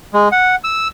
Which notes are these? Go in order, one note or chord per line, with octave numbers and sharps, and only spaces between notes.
G#3
F#5
E6